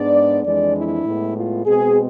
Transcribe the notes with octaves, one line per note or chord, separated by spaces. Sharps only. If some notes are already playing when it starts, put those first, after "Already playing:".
Already playing: G#2 G#3 B3 D4 D5
F2 E3 G#3 D4 D5
E4
A2 G#3 B3
F4
B2 G#3 C4 G#4